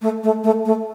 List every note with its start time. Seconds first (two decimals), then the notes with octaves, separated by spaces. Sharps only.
0.02 A3
0.24 A3
0.44 A3
0.65 A3